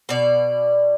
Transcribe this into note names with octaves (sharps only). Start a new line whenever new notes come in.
B2 D5